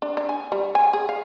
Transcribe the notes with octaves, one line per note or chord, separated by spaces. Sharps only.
D4
D4
G#5
G3
G#5
G#4
F5